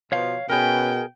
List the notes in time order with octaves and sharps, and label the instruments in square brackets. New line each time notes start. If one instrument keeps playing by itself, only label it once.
[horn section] B2 F3 [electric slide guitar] C#5 F5
[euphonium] B2 [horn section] C#4 B4 [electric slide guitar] G#4 A#4 [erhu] G5